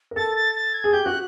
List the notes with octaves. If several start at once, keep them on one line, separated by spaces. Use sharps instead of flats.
A#4
A4 A6
A6
A6
G#6
G#4
G4 G6
F#4 F#6